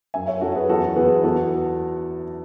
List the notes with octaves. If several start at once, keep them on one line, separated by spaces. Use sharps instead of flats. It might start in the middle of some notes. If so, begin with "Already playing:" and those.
F#2 E5 G#5
C#5 E5
F#2 F#4 A4
G#4 B4
E2 F#4 A4
E2 G#4 B4
E2 F#4 A4